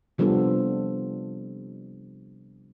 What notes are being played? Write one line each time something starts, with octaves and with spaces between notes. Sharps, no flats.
C3 F3 G3 B3 D4 A4